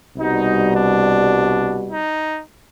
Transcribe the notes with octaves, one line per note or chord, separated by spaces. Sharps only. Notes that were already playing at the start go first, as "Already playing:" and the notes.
C2 B2 G3 D#4
D4
D#4